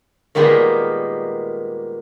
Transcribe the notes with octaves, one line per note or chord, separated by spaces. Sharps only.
A#2 D#3 G3 G#3 A#3 B3